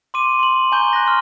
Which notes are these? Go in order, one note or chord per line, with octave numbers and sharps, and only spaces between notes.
C6 D6 D#7
C6 F#7
G#5 A#5 C#6 G6 G7
F#6 A#6
C6 F6